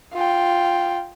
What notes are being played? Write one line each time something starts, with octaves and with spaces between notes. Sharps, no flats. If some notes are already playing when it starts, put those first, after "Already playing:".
F4 G5